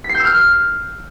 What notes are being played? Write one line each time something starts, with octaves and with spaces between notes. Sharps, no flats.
B6
C7
G6
E6
F6